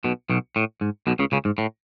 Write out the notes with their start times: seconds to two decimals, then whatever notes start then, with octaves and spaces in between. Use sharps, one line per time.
0.04 B1 B2
0.30 B1 B2
0.56 A2
0.81 G#2
1.07 B1 B2
1.19 C#2 C#3
1.32 C#2 C#3
1.45 G#2
1.58 A2